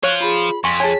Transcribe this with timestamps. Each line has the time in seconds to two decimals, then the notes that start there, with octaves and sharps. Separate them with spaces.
0.03 C5 C#5 F5 F#6
0.20 F4 G#4 B5
0.64 F2 G#5 C6 C#6 B6
0.80 G#4 C#5 G#5 A5